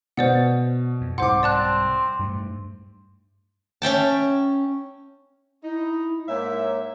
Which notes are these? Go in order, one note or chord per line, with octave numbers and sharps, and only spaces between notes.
B2 C5 D5 F#5
F2
C2 G#2 C5 F#5 C6 D6
C4 D5 A5 F#6
G2 G3 A3
C#4 E5 G5 A5
D#4 E4
G#2 A#3 C#5 E5